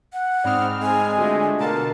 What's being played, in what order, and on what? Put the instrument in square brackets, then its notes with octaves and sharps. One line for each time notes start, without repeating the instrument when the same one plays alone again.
[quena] F#5
[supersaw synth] G#2 C4 F6 [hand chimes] D5 B5 D#6
[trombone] G#3 [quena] G#5
[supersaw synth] D3 A3 [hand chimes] F4 F#4
[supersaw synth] B2 D3 A5 [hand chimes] A#4 A#5 [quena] F5